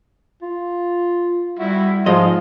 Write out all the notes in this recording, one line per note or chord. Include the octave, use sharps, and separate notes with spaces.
F4
G3 E4 F#4
G#2 F3 G#4 D#5 F5 C6